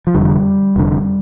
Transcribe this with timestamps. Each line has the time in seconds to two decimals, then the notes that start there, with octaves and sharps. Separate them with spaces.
0.07 F3
0.14 F1 F2 D3 G3
0.76 F1 F2 D3